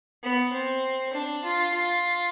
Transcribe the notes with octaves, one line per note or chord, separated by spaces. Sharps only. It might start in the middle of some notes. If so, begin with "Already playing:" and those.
B3
C4
D4
F4
F4